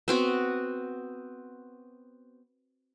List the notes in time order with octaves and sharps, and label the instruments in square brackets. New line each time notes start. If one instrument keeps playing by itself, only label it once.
[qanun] B3 C4 F#4